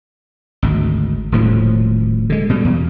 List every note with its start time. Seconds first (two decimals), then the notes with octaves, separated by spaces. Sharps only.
0.62 G#1 D2
1.32 D#1 D2 A2 F3
2.30 D3 G#3
2.49 B2 D3 G3
2.64 E2